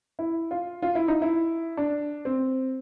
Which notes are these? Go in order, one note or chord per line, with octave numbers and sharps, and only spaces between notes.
E4
F4
F4
E4
D#4
E4
D4
C4